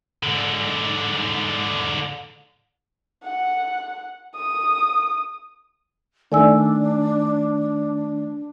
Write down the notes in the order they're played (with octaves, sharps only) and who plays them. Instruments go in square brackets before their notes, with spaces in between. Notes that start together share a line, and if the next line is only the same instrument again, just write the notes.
[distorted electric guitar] G#2 D3
[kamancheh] F#5
D#6
[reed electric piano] D#3 A3 [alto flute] D4 [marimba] D5 G#5 E6